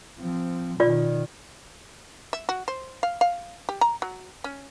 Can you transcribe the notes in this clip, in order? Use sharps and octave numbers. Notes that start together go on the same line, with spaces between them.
F3 C4
B2 D#3 F4 D5
E5
F#4
C5
F5
F5
G4
A#5
F#3
C#4